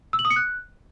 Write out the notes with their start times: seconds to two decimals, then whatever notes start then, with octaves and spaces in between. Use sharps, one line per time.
0.13 E6
0.19 F#7
0.25 D#6
0.30 C#7
0.36 F#6